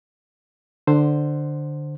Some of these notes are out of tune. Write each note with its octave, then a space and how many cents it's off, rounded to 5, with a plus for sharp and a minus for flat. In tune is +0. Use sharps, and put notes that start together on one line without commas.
D3 +15 C5 +0